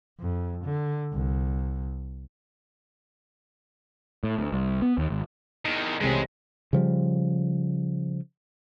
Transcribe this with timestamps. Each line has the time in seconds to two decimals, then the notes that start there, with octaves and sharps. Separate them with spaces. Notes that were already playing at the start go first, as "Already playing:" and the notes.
0.20 F2
0.65 D3
1.13 C2
4.24 A2
4.39 D2
4.53 C2
4.82 B3
4.98 D#2
5.10 G#1
5.65 E2 D#3
6.00 C2 G#2 G#3 A3
6.73 C#3 F3 G3